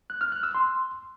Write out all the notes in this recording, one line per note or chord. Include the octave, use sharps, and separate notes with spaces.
F#6
F6
F#6
E6
C6